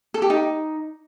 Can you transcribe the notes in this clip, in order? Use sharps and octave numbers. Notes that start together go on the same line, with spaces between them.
A4
G4
D#4